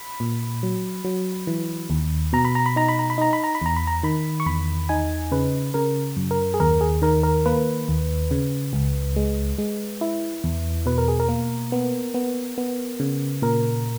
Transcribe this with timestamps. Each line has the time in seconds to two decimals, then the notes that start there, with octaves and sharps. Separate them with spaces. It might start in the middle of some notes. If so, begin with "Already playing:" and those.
Already playing: B5
0.20 A#2
0.63 F#3
1.05 F#3
1.47 E3
1.90 D#2
2.33 B2 A#5
2.45 B5
2.55 A#5
2.66 B5
2.76 D#4 A#5
2.89 B5
2.99 A#5
3.10 B5
3.18 D#4 A#5
3.33 B5
3.44 A#5
3.55 B5
3.61 E2 A#5
3.76 B5
3.87 A#5
4.03 D#3 B5
4.40 C#6
4.46 E2 B5
4.89 D#4 G#5
5.32 C#3 B4
5.74 C#3 A#4
6.16 F#2
6.31 A#4
6.54 G#4
6.60 D#2 A#4
6.81 G#4
7.02 D#3 A#4
7.23 A#4
7.46 A#3 B4
7.88 D#2
8.31 C#3
8.73 C#2
9.16 G#3
9.58 G#3
10.01 E4
10.44 E2
10.86 B2 B4
10.98 A#4
11.08 G#4
11.20 A#4
11.28 A#3
11.72 B3
12.14 B3
12.58 B3
13.00 C#3
13.42 A#2 A#4